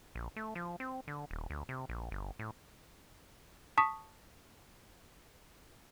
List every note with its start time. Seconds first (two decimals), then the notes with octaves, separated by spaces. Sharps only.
0.15 A#1
0.36 A3
0.55 F3
0.80 C4
1.08 D3
1.31 D#1
1.50 D2
1.69 C3
1.89 A#1
2.11 G1
2.39 A2
3.78 A5 C#6 D#6 B6